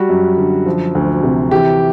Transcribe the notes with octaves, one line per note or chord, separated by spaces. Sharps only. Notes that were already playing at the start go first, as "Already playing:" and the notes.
Already playing: G3 F#4
F#2
D3
F3
D2
C3
E3 G4